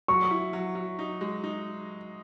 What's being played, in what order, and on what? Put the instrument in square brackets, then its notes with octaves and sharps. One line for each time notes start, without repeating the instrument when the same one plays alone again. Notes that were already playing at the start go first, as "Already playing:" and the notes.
[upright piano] F#3 [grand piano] C#6
[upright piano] E4
F#3
F#3
D#4
G#3
D#4